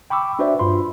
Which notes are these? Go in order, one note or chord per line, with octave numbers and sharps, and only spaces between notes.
G5 B5 C#6 D6 E6
D4 F#4 B4 C5 D5 E5
G2 F4 B5 C6